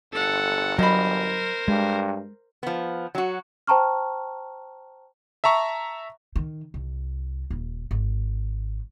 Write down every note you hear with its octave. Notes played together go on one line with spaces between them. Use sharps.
G1 A4 F#5
F#3 A#4 C5 D#5 B5
G2 G#3
F3 B3
F#3 F#4
C5 G5 A5 A#5 C#6 F6
E5 A5 A#5 C#6
D#3
C2
D#1
G#1